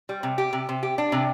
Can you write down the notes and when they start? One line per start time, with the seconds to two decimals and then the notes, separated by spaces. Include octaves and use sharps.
0.09 G3
0.23 C3
0.38 G4
0.53 C3
0.69 C3
0.83 G4
0.98 D4
1.12 C3